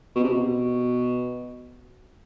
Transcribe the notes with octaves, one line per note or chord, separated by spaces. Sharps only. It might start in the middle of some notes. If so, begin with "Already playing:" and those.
B2
C3
B2